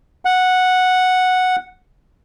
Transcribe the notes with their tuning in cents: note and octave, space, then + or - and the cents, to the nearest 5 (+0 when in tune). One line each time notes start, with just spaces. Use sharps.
F#5 -5